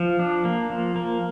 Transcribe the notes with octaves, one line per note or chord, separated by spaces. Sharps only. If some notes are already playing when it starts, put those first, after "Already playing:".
Already playing: F3
D4
A#3
F3
A#3